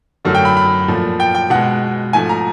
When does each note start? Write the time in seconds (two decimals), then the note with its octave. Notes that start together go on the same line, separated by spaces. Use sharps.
0.25 F#2 D3 F#3 A3
0.35 G5
0.45 B5
0.57 B5
0.88 A#2 F3 A3
1.20 G5
1.35 G5
1.50 B2 G#3 F#5
2.13 G#2 F3 A3 G#5
2.29 A#5